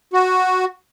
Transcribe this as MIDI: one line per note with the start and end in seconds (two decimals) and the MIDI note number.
0.13 0.65 66